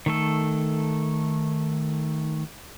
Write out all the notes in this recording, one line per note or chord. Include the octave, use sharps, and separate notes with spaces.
D#3 A3 A4